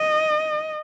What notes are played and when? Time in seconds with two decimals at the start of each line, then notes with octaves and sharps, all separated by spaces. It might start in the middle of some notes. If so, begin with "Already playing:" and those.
Already playing: D#5